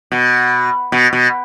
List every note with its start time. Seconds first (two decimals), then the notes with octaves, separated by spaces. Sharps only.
0.12 B2
0.92 B2
1.13 B2